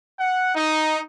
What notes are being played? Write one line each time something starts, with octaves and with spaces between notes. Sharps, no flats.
F#5
D#4